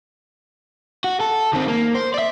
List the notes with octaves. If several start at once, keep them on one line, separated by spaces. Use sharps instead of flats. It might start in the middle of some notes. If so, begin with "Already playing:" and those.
F#4
A4
D#3 C4
A#3
C5
D5 E5